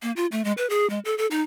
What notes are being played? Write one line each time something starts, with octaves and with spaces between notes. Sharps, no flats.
A#3
F4
A3
G#3
B4
G#4
G#3
A4
A4
D#4